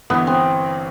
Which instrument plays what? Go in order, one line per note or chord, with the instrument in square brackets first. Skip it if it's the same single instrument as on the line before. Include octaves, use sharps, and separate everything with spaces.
[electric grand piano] G1 G2 E3 [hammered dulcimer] B3
[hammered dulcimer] C4